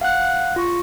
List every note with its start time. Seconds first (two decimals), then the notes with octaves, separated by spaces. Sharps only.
0.01 F5 F#5 F#6
0.56 F4 C#6